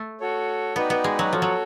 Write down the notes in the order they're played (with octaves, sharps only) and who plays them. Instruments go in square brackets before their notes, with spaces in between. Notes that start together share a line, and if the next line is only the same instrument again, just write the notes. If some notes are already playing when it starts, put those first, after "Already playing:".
Already playing: [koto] A3
[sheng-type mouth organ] F#4 A4 C#5
[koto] B3 [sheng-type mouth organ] D#4 F#4 B4 D5 G5
[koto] B3
G#3
F#3
[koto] F3 [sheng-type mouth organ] F#4 A4 C#5
[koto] F#3